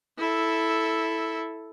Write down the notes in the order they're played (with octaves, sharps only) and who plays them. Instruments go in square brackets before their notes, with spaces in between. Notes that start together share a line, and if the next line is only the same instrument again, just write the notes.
[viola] E4 A4